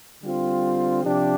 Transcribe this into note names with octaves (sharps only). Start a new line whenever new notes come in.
D3 G3 C4 F4
C3 F3 D4 G4